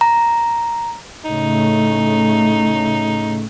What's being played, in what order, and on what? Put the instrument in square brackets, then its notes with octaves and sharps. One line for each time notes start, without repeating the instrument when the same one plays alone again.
[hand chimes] A#5
[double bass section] A2 C#3 A3 [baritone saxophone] D#4